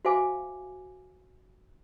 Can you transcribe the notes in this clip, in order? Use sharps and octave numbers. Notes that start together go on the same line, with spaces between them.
F#4 C5 E5 F5 G#5 D6